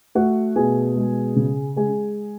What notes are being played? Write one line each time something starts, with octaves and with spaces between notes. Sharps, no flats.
A3 F#4 F#5
B2 G#4 G#5
G#3
C#3
G#3 G#4 G#5